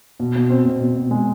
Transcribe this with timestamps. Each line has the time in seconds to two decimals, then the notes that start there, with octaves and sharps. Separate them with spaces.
0.20 B2
0.36 B2
0.50 C4
0.65 B2
0.81 B2
0.96 B2
1.11 G#3